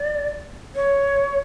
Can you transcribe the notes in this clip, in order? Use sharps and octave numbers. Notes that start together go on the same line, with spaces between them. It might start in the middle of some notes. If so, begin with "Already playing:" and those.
Already playing: D5
C#5